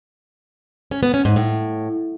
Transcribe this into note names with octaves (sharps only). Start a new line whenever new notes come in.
C#4
B3
C#4
G#2
A2